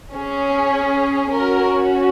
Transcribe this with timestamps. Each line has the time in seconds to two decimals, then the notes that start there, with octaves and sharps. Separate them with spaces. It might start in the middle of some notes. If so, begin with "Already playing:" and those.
0.14 C#4 G#4
1.30 C#4 F#4 A#4